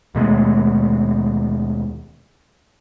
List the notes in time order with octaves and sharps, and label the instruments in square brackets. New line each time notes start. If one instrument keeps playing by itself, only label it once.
[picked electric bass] D#2 B2 G#3 A3